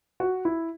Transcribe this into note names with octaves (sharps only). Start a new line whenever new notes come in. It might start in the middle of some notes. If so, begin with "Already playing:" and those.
F#4
E4